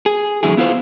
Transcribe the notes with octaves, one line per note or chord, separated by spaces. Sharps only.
G#4
A2 D3 E3 F#3 E4 G#4
B3 E4 F4 G#4 C5